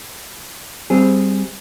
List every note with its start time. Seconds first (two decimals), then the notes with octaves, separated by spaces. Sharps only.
0.90 G3 C4 G#4